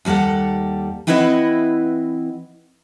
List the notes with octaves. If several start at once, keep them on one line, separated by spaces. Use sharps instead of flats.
D#2 G3 A#3 A4 F#5
E3 C4 E4 B4 D#5 F#5